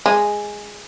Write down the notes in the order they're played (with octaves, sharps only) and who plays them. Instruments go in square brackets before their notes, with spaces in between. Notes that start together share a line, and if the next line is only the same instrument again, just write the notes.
[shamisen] G#3